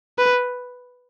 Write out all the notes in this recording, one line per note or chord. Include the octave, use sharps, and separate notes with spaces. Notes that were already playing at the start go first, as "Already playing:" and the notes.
B4